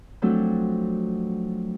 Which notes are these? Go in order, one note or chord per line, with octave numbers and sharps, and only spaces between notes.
F3 F#3 A3 C4 D4